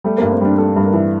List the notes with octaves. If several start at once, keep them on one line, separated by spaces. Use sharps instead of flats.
G3 A3
G2 A#3
C4
G3 D4
G3 A4
G2
A#4
E3